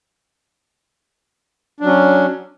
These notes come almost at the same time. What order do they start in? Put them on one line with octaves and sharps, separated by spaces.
D4 F#3 C#4